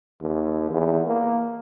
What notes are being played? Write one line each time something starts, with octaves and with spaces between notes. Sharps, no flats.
D#2
E2
A#3